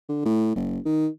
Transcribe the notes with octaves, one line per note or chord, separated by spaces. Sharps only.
D3
A2
F#1
D#3